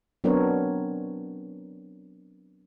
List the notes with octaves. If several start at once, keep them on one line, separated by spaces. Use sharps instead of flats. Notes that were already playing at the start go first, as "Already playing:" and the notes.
F#3 B3 C4 D4 A#4 C#5